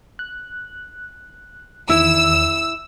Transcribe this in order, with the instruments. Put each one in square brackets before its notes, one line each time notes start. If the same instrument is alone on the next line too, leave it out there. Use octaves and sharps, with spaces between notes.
[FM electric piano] F#6
[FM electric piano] E2 D#3 [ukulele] E4 [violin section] E6